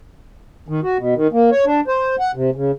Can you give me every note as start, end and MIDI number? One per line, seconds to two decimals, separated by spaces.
0.68 0.80 51
0.83 0.98 66
0.98 1.14 47
1.16 1.27 51
1.33 1.50 58
1.51 1.65 73
1.66 1.81 62
1.88 2.16 72
2.19 2.31 78
2.35 2.50 48
2.55 2.71 49